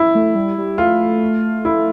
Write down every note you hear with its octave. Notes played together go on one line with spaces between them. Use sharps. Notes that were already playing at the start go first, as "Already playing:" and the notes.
Already playing: E4
A3
G3
G3
A3 F4
E4